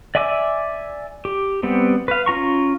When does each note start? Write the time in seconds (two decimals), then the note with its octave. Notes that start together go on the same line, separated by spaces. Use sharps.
0.15 D5 E5 G#5 D6 E6
1.25 G4
1.63 G3 B3 C4
2.08 B4 F5
2.26 C#4 F4 A#5 C#6